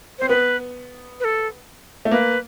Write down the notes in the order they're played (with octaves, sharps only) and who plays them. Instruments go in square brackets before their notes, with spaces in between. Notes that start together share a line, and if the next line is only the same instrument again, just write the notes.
[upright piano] C4 [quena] C5
[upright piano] B3 [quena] B4
[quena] B4
A4
[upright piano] A3
[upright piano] A#3 [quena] B4